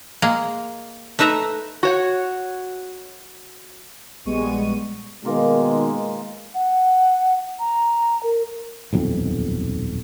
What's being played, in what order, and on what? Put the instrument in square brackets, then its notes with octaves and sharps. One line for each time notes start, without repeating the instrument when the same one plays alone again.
[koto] G#3 A#3 G#4
A3 D#4 B4 E5 A#5
[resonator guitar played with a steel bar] F#4 C#5 F#5
[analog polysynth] A#1 G3 G#3 B3 C#6 D#7
[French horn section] B2 D#3 [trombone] G#3 [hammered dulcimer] A#3 F4 A#4
[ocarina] F#5
A#5
A#4
[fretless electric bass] D#1 B1 F2